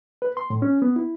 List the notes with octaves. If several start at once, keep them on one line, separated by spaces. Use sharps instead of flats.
B4
C6
A2
C#4
B3
E4